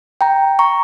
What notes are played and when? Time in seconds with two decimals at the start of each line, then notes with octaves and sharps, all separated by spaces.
0.21 G5 A#5
0.59 A#5 C#6